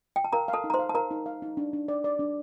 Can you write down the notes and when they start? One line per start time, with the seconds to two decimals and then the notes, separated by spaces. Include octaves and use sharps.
0.16 G5
0.24 A5
0.33 A#4 F5 A#5
0.48 F5
0.53 A4 A5
0.64 D#4
0.70 A#5
0.74 C5 C6
0.79 F5
0.89 A5
0.95 A#4 F5 A#5
1.11 D#4
1.26 F5
1.42 D#4
1.57 D4
1.73 D4
1.88 D5
2.04 D5
2.19 D4